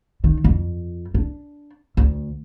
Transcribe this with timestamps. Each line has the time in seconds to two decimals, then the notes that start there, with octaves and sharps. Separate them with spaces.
0.24 D#3
0.44 F2
1.14 D4
1.97 D2